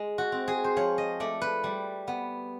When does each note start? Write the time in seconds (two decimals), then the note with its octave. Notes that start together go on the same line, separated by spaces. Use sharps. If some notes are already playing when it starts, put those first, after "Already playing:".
Already playing: G#3
0.18 F#4
0.32 C4
0.48 G#4
0.64 C5
0.76 F3 C#5
0.98 D#5
1.20 A3 D5
1.41 B4
1.64 G3
2.08 B3